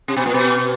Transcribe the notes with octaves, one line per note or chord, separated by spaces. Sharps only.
C3
B2
A#2
B2